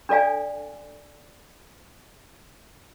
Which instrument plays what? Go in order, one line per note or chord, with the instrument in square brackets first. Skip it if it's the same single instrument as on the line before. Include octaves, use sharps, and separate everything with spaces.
[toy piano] D4 A4 D5 F5 G#5